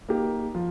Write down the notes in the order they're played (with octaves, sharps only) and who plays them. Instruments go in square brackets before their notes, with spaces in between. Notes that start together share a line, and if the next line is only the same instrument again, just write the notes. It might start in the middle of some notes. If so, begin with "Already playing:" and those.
[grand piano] A#3 D#4 G4
F3